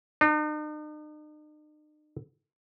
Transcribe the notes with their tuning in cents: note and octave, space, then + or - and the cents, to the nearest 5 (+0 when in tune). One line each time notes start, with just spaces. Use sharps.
D#4 -45